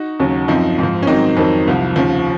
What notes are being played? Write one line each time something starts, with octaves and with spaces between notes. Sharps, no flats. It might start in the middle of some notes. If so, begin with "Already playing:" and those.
Already playing: D#4 F#4
D#2 C#3 F#3
F#2 F3 C4 D#4
G#2
F3
C#4
G#2 D#3 F#3 C4 D#4
F2 D#3 F#3
C2 C3 F3
D#2 C#3 F3